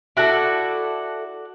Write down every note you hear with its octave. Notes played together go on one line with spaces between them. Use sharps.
E4 F#4 A4 D5